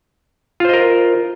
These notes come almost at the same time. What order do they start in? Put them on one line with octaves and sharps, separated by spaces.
F4 C5 D#5 A#4